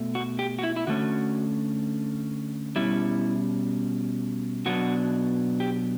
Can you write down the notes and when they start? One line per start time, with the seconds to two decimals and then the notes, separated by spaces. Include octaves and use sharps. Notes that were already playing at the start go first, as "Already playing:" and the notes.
Already playing: B2 A3
0.15 F#4
0.39 G4
0.59 F#4
0.63 E4
0.76 E4
0.87 D3 A3 C#4 F#4
2.76 B2 G3 C#4 E4
4.66 B2 F#3 B3 D4 F#4
5.60 G4